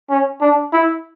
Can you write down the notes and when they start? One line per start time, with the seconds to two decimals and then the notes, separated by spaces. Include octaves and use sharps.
0.10 C#4
0.41 D4
0.73 E4